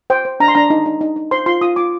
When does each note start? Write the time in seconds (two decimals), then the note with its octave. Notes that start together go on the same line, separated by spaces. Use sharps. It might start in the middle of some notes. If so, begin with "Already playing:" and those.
0.10 C5 G5
0.25 C5
0.40 D4 A#5
0.48 C6
0.55 D4 A#5
0.70 D#4
0.86 D#4
1.01 D#4
1.16 D#4
1.31 C5 C6
1.46 F4 C6
1.61 F4 D#6
1.76 F4 D6